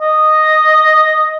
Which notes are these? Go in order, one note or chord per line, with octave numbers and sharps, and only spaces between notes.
D#5